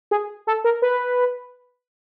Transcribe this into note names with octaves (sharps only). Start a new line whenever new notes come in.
G#4
A4
A#4
B4